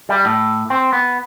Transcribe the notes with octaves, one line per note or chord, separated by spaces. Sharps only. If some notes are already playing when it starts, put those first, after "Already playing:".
G3
A2
C4
B3